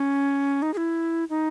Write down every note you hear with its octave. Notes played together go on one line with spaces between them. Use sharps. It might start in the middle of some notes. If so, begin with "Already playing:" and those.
Already playing: C#4
D#4
G#4
E4
D#4